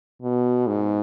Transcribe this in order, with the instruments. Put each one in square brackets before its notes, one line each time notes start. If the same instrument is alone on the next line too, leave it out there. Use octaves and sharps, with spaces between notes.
[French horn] B2
G#2